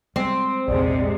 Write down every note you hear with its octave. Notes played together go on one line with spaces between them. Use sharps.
G3 G#3 C4
A#1 E2 G#2 C3 G#3 D5